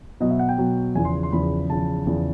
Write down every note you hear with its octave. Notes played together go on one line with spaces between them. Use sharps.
B2 F#3 D#5
E5
F#5
G5
B2 F#3
E2 C#3 F3 G#5
C6
C6
E2 C#3 F3 B5
E2 C#3 F3 A5
E2 C#3 F3